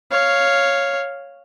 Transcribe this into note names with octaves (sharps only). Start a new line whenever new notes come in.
C#5 F5